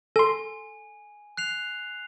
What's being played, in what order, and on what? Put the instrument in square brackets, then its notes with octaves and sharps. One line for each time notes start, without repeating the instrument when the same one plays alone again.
[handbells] A4 C6 [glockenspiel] G#5
[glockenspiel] F#6 C7 F7